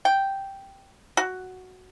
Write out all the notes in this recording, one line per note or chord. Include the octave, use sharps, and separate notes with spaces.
G5
F#4